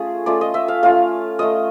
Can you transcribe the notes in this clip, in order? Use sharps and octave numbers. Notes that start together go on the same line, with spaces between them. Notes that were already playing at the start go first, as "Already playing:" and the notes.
Already playing: A3 C#4 F4 G#4
A3 C#4 F4 D5
D#5
E5
F5
A3 C#4 F4 F5
A3 C#4 F4 D#5